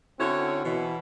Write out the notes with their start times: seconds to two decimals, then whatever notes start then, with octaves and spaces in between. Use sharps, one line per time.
0.20 D3 C4 C#4 E4 F#4 C#5
0.64 B2 E3